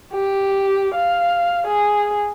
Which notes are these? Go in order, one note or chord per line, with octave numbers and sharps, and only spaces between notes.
G4
F5
G#4